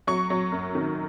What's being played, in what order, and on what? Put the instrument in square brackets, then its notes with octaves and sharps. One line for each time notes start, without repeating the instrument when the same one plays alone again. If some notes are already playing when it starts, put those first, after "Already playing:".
[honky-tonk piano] F#3 C#6
F#3
F#2
D#3